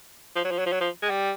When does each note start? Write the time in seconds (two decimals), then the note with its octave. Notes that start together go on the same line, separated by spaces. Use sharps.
0.36 F3
0.44 F#3
0.51 F3
0.58 F#3
0.66 F3
0.72 F#3
0.80 F3
1.02 G#3
1.10 G3